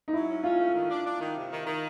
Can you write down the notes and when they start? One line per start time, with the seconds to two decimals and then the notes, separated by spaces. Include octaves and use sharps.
0.08 D#4
0.13 F#3 E4
0.28 C#4
0.43 C#4 F4
0.59 A3
0.75 D#3
0.90 D4
1.05 D4
1.21 D#3
1.36 C3
1.51 D#3
1.66 D#3